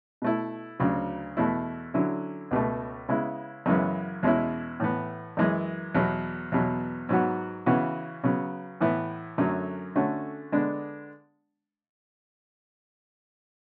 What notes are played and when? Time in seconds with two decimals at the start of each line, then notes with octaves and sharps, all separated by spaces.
0.22 B2 A3 E4
0.80 D2 C#3 F#3
1.37 E2 B2 A3 E4
1.94 D3 F#3 C#4 E4
2.51 C#2 B2 A3
3.09 C#3 G#3 B3 E4
3.66 F#2 C#3 E3 G#3 B3
4.23 E2 B2 G#3 C#4 E4
4.80 A2 E3 B3
5.37 F#2 E3 G#3
5.95 E2 B2 F#3
6.52 E2 B2 F#3
7.09 G#2 F#3 B3 F#4
7.66 C#3 E3 B3 F#4
8.24 C#3 F#3 B3
8.81 A2 E3 B3 E4
9.38 F#2 D3 F#3 A3 C#4
9.96 D3 A3 C#4 F#4
10.52 D3 G#3 B3 D4